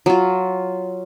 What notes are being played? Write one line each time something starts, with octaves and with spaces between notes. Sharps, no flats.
F#3 F4